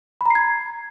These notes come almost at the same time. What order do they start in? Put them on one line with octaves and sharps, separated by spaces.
B5 A#5 C7 G#6